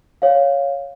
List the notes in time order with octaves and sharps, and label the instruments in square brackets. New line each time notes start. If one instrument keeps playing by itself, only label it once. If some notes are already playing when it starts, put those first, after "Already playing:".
[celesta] C#5 F5